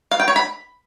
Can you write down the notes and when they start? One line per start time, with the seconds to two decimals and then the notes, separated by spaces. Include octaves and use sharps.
0.11 F5
0.20 G5
0.28 C#5
0.36 B5